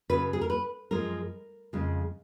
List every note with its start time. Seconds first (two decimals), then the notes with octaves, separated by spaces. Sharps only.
0.09 F#2 C#3 F#3 B4
0.33 G#4
0.41 A#4
0.50 B4
0.91 F#2 F3 G#3 A#4
1.73 F2 C#3 G#3